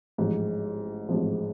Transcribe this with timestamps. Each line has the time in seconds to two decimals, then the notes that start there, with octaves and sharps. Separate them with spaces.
0.18 A1 G#2 F3
1.09 A1 G#2 F3